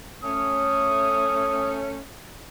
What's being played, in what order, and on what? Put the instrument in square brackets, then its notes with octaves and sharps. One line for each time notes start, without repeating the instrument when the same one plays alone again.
[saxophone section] A3 C#4 [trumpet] D#6